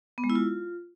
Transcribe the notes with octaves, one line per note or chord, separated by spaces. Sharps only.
B3
G#3
E4
F4